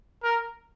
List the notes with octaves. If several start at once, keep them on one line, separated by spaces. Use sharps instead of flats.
A#4